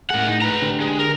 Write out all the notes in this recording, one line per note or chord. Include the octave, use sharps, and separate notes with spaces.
A2 G#4 A#4 F#5
D#4
B4 A#5
D3 D4 G4
G#3
A#4